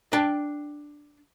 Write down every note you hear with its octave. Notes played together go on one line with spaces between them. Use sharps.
D4 G5 A5